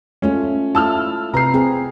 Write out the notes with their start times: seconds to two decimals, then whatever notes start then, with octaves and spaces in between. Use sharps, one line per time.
0.22 G#3 A3 C#4 F4
0.75 A3 E4 F4 A5 E6 F6
1.34 C3 B4 A#5 C7
1.54 C4 G#4